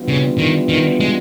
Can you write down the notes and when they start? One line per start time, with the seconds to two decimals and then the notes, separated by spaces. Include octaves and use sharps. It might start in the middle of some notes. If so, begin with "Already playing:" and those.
Already playing: E3 G3 B3 D4 F4
0.08 C#3
0.38 D#3
0.69 D#3
1.00 G#3